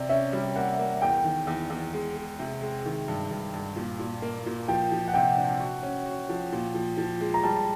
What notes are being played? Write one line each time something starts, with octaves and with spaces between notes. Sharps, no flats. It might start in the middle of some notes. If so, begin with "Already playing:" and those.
Already playing: C3 D5
C#4 E5
G3
A#3 F#5
A#3
E2 G5
D#3
E2
E2
G#3
G#3
C3
G#3
D#3
G2
G2
G2
A#2
A#2
A#3
A#2
F3 G5
F3
F#5
C3 G5
D4
F#4
C#4
F#4
F3
A#2
F3
F3
G#3
A#5
G3 A5